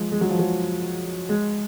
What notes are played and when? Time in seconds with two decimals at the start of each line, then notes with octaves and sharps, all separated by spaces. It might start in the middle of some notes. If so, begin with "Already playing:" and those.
Already playing: F3 G#3
0.12 G#3
0.21 F#3
0.30 F3
0.39 F#3
1.29 G#3